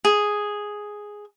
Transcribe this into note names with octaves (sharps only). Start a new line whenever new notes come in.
G#4